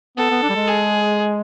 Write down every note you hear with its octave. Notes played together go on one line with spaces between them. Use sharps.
B3 A4
B3
D4
G3
G#3
G#4